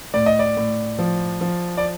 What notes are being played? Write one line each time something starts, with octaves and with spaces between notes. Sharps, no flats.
A2 D5
D#5
D5
A2
F3
F3
D5